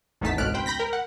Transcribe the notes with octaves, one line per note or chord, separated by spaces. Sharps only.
G#1 E2 A3 D#4 A5 B6
G#1 C#2 B2 F6 F#6 D7
C5 G5 B5
B5 G6 A#6 B6
A#4
F#5